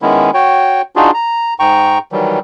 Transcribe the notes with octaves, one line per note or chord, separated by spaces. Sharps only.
D#3 G#3 B3 C#4 E4
F#4 C#5 G5
D4 D#4 F4 F#4 G#4
A#5
G#2 G5 A#5 C#6
D#3 E3 F#3 G3